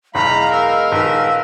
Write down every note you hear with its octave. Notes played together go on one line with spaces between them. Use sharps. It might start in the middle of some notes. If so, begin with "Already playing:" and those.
B1 E2 G#3 F5 A#5 B5
A#4 E6
A#1 D#3 B4 E6